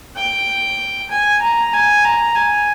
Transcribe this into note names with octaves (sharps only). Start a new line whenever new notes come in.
G5
G#5
A#5
G#5
A#5
G#5